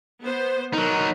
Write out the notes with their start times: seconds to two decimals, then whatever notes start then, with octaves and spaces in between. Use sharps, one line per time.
0.23 B3 C5
0.73 F#3 D#4 A#4